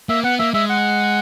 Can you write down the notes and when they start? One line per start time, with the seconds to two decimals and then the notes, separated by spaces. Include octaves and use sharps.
0.09 A#3 E5
0.24 B3 F#5
0.39 A#3 E5
0.54 G#3 E5
0.69 F#5